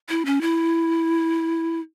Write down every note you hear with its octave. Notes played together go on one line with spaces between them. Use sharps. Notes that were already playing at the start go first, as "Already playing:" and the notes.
E4
C#4
E4